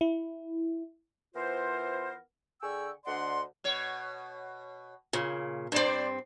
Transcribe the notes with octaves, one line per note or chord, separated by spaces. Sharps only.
E4
E3 B3 F4 A#4 C5
D3 G#4 G5 C#6 E6
D2 D3 D5 D#5 F#5 C6
B2 C#5
A#2 C#3
G2 C4 D4 C5 D5